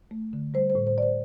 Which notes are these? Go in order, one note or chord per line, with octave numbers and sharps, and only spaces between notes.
A3
D3
G3 C5
C5
A2
C5
A2 D5
C5